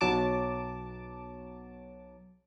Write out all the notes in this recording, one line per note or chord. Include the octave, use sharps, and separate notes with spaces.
B1 F#3 A5 D6